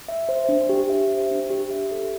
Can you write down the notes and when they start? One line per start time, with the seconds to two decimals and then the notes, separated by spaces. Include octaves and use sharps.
0.08 E5
0.29 C5
0.49 D4
0.69 G4
0.89 E5
1.11 C5
1.31 D4
1.50 G4
1.71 E5
1.91 A4